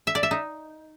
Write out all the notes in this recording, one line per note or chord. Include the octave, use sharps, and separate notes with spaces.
E5
D5
E5
D#4